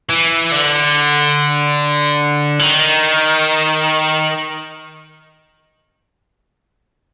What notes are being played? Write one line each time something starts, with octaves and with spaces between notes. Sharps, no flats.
E3
D3
E3
D#3